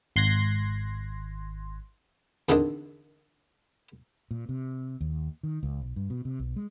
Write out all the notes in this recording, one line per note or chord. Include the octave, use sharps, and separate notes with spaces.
G#1 C6 F#6 G#6 A#6
E2 D3 D#3 C4 D4 D#5
A#2
C3
D#2
D#3
C#2
B1
G2
B2
C3
B1
G#3